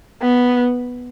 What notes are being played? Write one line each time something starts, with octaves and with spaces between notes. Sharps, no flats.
B3